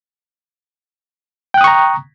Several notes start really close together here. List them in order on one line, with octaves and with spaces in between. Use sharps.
G5 F#6 D#6 C#6 A#5